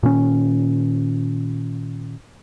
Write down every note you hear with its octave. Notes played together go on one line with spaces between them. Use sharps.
A#2 D#3 C#4